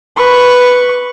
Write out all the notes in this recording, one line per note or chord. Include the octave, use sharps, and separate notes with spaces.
B4 C#6